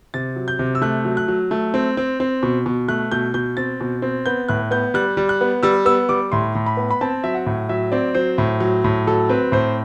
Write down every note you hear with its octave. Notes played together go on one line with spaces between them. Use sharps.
C3 A6
F#3
G6
C3
E6
A3 F#6
F#3
F#6
F#3
A3
C4
C4
C4
B2
B2
A3 F#6
B2 G6
B2 G6
C4 A6
B2
C4
B3 G6
A2 F#6
B3 G6
G3 F#6
G3
F#6
B3
G3 E6
B3 E6
G3 D6
A2 C6
A2
B5
B3
B5
C4 A5
F#3 E5
F#5
A2
F#3 E5
C4 D5
F#3 C5
A2
F#3
A2
F#3 A4
C4 B4
A2 C5